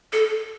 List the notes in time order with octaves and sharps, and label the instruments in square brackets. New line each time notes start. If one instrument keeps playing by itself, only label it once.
[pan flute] A4